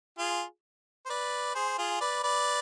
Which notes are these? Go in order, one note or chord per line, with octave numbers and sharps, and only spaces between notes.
F4 G#4
C5
B4 D5
G#4 C5
F4 G#4
B4 D5
B4 D5